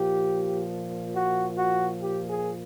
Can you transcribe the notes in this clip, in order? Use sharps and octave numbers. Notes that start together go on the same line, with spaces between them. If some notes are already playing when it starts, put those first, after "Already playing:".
Already playing: A#2 F3 G4
F#4
F#4
G4
G#4